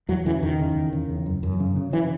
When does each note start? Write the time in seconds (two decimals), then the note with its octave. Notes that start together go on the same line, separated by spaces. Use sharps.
0.09 E2 F#3
0.26 C#3 E3
0.42 E2 D#3
0.59 C#3
0.76 E2
0.93 C#3
1.10 E2
1.26 F#2
1.43 F#2
1.60 C#3
1.76 C#3
1.93 C#3 E3